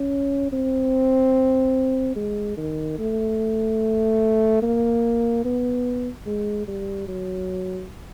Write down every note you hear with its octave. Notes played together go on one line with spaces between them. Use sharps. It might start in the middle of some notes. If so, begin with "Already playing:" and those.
Already playing: C#4
C4
G#3
D#3
A3
A#3
B3
G#3
G3
F#3